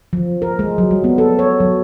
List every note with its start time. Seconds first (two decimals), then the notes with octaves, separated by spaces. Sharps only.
0.13 F3
0.42 A#4
0.59 G#3
0.78 F#3
0.91 G3
1.04 B3
1.18 A4
1.39 C#5
1.60 F#3